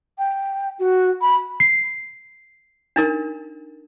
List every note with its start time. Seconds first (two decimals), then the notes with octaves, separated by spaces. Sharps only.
0.18 G5
0.79 F#4
1.21 B5
1.60 C7
2.96 D4 D#4 A#4